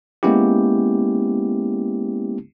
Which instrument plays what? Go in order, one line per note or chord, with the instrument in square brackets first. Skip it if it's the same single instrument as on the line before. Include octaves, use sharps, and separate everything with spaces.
[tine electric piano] G#3 A#3 B3 C#4 E4 G4